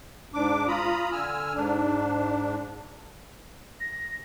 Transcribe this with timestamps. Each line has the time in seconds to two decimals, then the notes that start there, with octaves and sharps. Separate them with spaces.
0.34 G#2 D4 D6
0.68 F4 A#5 B5 D#6
1.12 D3 G#5 E6 F6
1.55 G#2 D4
3.80 A#6